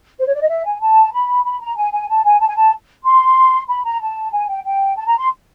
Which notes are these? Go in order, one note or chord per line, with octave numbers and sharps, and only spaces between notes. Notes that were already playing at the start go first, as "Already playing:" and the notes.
C5
C#5
D5
D#5
E5
G#5
A5
B5
B5
A#5
G#5
G#5
A5
G#5
A5
G#5
A5
C6
B5
A#5
A5
G#5
G5
G5
A5
A#5
C6